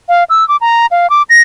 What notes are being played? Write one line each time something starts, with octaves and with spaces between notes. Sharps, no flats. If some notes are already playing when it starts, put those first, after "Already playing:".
F5
E6
D6
A#5
F5
D6
A#6